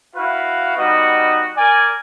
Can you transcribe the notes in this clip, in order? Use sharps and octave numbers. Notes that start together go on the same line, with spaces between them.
E4 F#4 B4 F5
G3 B3 D#4 F#4 D#5
A#4 D5 G#5